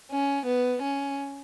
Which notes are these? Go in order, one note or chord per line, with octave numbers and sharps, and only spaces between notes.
C#4
B3
C#4